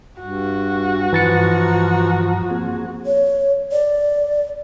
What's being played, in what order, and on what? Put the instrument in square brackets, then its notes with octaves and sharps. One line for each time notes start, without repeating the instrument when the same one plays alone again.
[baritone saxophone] G2 [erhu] F#4
[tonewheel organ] G2 A#5 [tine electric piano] E3 A6 C#7 [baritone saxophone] F3
[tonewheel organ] A#3 C4 G#4
[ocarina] C#5
D5